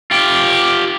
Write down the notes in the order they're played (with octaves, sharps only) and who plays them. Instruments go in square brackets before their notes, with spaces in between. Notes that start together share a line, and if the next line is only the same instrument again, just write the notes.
[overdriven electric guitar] F4 G4